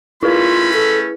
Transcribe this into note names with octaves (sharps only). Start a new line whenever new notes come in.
A3 C#4 E4 F4 G#4 B4 B5
A4